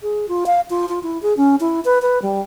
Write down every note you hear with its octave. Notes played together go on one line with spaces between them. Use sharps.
G#4
F4
F5
F4
F4
E4
G#4
C#4
E4
B4
B4
G3